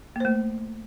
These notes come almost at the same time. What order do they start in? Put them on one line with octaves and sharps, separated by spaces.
A#3 C5 A3